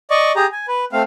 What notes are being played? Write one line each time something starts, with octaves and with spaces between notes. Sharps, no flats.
D5 D#5 C#6
G4 G#4 A#5
G#5
B4
A3 C4 F5